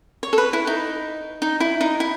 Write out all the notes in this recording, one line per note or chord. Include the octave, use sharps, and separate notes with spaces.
C#5
A4
B4
E4
D#4
D#4
E4
D#4
E4